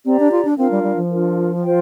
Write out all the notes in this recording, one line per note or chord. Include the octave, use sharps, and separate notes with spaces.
C4 G4 D5 A#5
D4
F4
D4
C4 D4 F4 A#4 F5
G3
G3
F3
D4 F4 A#4
F4 C5 G5